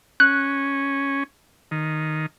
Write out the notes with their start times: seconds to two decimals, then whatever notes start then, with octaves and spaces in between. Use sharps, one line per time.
0.20 C#4 F#6
1.71 D#3